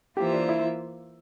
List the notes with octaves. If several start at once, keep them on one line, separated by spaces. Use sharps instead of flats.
E3 A#3 F4 G4 C5 E5
D4
E4